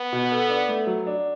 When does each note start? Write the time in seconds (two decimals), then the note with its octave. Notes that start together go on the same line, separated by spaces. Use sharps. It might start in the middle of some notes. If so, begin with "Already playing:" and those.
Already playing: B3
0.13 B2
0.32 A4
0.49 D4
0.69 A3
0.87 F#3
1.07 D4